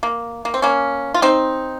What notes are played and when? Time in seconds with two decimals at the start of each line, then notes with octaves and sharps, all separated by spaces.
0.03 A#3
0.45 A#3
0.54 C4
0.62 A#3 C#4
1.14 F4
1.22 C4 D#4